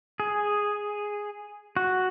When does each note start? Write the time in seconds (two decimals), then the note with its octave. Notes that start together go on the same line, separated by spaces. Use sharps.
0.20 G#4
1.77 F#4